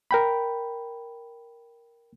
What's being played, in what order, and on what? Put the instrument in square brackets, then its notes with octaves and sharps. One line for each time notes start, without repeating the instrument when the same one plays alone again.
[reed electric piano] A#4 G5 B5